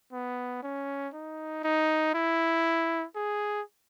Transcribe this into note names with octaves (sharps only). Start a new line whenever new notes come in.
B3
C#4
D#4
D#4
E4
G#4